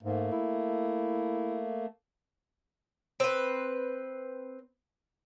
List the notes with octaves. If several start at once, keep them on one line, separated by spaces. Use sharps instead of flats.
G#2 A3 A#3
E4
C4 B4